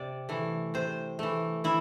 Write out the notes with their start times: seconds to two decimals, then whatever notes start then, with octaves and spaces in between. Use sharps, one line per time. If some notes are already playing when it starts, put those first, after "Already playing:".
Already playing: C3 D5
0.29 E3 A3
0.74 C3 C5
1.19 E3 A3
1.64 E3 E4